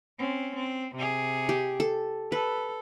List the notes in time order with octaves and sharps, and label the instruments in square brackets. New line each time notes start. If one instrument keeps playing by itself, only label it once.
[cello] C4 C#4
C4
C3 G#4
[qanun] G4
A4
[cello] A4 [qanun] B4